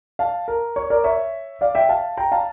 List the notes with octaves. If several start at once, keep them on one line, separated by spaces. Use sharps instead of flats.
F5 A5
A#4
C#5
A#4 D5
C#5 E5
D5 F5
E5 G5
F5 A5
G5 A#5
F5 A5